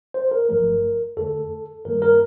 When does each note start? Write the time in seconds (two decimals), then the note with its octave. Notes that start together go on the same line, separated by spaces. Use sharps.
0.14 C5
0.31 A#4
0.49 G1 G2 F3 A3 A#4
1.17 F2 D3 A3 A4
1.85 G2 D#3 G3 A#3 A#4
2.02 A#4